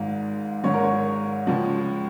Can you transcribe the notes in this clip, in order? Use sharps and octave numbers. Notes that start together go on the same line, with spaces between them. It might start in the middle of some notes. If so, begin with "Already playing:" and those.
Already playing: G#1 G#2 G#3 F5
G#1 G#2 G#3 C#5
A#4
C#5
C#2 C#3 F3 G#3